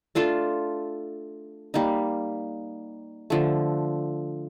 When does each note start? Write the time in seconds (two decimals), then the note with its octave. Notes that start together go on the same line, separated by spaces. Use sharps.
0.15 A3 D4 F4 A4
1.74 G3 A#3 D#4
3.30 D3 F3 A3